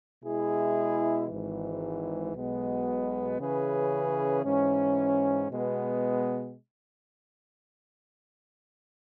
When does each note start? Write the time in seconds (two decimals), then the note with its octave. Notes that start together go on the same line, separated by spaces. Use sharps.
0.22 B2 G#3 E4 G#4
1.28 G#1 G#2 E3
2.33 B1 B2 G#3 B3
3.39 C#3 E3 C#4 G#4 B4
4.44 G#2 E3 C#4
5.49 B2 G#3 B3